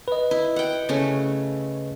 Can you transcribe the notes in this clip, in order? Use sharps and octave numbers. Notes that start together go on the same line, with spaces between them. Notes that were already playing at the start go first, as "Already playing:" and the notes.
B4 D#5
E4
F#5 G5
C#3 A3 C#4